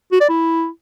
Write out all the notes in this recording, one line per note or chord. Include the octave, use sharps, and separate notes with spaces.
F#4
D5
E4